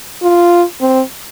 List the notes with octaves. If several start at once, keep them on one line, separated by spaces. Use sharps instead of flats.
F4
C4